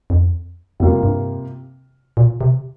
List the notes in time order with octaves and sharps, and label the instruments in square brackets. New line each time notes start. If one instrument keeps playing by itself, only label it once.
[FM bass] F2
[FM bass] F2 [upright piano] C3 G3 A#3 F4
[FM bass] G2
A#2
C3